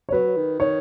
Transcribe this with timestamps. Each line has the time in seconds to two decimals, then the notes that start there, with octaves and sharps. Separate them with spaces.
0.09 C#5
0.12 F#3 B4
0.37 D#3
0.60 D#3 C#5